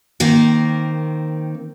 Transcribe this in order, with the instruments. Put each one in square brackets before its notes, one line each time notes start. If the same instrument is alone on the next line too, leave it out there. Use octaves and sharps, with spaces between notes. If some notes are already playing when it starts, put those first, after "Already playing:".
[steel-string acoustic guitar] D#3 A#3 C4